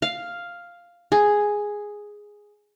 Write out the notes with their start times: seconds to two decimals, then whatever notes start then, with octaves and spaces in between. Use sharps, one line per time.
0.02 F5
1.12 G#4